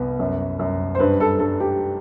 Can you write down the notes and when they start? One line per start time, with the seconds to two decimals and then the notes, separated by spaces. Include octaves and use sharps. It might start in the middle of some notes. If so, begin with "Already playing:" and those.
Already playing: C2 B3
0.19 F#2
0.59 F#2
0.95 C5
0.99 G2 B4
1.20 A4
1.39 G2 A4
1.60 G4